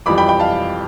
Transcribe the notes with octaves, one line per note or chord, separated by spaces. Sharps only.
F2 E3 G3 B5 D6
G5 B5
G5 B5
F5 A5